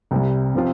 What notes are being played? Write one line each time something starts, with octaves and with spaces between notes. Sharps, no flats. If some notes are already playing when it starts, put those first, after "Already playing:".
C2 C3 G3
C3 F3 C4 F4